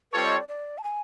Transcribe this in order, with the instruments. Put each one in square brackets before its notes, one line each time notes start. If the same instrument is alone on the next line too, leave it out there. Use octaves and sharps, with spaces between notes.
[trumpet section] G3 C4 F4 A4 C#5 [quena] B4
[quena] D#5
D5
D5
A5
G#5